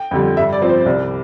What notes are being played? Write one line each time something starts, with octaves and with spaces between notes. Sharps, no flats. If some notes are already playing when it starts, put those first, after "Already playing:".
Already playing: G5
F2 D3 G3
G2 E5
D5
F3 C4
C5
C2 D5